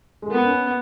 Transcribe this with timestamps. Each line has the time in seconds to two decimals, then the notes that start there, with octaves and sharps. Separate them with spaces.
0.22 G#3
0.30 A#3 B3
0.45 C#4